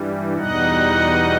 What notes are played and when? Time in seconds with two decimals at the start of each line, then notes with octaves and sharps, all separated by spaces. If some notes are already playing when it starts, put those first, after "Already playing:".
Already playing: G2 E3 G3
0.38 E2 B2 G3 D#4 D#5 F#5